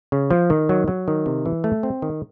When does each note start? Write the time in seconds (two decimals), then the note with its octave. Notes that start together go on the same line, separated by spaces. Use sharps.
0.12 C#3
0.31 F3
0.50 D#3
0.69 F#3
0.88 F#3
1.08 D#3
1.26 C3
1.46 E3
1.64 A3
1.83 C4
2.02 D#3